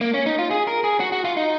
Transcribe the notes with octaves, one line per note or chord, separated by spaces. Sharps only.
A#3
C#4
D#4
F4
G#4
A#4
G#4
F#4
F#4
F4
D#4